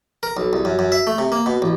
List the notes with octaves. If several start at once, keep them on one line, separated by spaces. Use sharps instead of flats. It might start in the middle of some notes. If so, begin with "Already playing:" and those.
A#4
B1
C2
F#2
F#2
E5
A3
C3
A#3
B2
A1